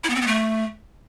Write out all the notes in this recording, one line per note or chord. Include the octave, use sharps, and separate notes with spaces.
E4
B3
C4
B3
A3